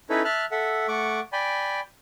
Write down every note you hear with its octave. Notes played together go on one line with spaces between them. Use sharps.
C#4 D#4 E4 A4 B4 C#5
E5 A5 F6 F#6
A4 E5 F#5
A3 F#5 C#6 D6
D5 G5 G#5 B5